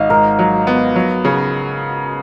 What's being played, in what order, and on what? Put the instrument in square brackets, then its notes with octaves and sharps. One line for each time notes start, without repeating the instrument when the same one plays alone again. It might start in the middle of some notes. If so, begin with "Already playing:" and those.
Already playing: [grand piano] G#1 [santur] D#5 F5
[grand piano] G#2 [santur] A#4
[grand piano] F#3
B3
F#3
C#3